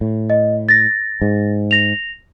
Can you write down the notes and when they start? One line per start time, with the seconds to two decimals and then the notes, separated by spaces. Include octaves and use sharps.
0.01 A2
0.30 D#5
0.69 A6 A#6
1.21 G#2
1.71 A#6 F7